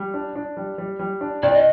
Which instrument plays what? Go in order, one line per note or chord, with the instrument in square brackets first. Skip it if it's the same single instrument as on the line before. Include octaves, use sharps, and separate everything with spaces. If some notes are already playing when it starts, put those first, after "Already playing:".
Already playing: [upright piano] G3
D4
D4
G3
G3
G3
D4
[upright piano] C2 [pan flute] D5
[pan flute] D#5